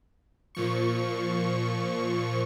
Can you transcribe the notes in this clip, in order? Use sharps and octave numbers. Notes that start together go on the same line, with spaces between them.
A#2 F3 C#6